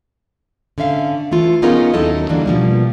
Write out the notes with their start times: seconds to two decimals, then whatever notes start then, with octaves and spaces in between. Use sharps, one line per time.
0.78 D3 C#4 E5 F5
1.31 E3 A3 F4
1.62 B3 C#4 D#4 F4 G#4 A#4
1.94 D#2 F#3 D#4 E4 A4 D#5
2.29 D3 E3 G3 A#3 D4
2.46 B2 F3 G3 A#3